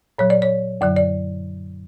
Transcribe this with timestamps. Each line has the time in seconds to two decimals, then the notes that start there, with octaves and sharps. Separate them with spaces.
0.18 A#2 F#3 C#5
0.30 D5
0.42 C#5
0.81 F#2 D3 F#3 D5
0.96 D5